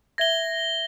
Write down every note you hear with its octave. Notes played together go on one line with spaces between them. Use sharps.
E5 G#6 A#6 G7